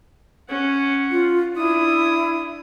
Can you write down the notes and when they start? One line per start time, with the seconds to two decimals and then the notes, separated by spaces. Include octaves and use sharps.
0.49 C#4 F#5
1.11 F4
1.56 D4 E4 D#6